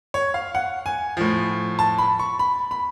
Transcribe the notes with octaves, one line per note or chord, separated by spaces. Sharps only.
C#5
F5
F#5
G#5
A2 F3
A5
B5
C#6
B5
B5